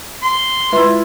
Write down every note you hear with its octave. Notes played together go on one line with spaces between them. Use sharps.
C6
G#3 E4 F4 B4 E5